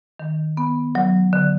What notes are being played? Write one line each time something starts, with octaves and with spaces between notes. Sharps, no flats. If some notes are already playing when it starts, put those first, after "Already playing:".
D#3
B3
F#3
D3